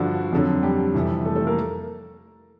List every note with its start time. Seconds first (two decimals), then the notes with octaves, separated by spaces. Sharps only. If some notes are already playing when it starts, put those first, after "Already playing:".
Already playing: G2 D3 F3 F#4
0.33 F2 D3 F#3
0.63 G3 G4
0.94 F2 C3 E3
1.25 A3 A4
1.35 A3 A4
1.47 A#3 A#4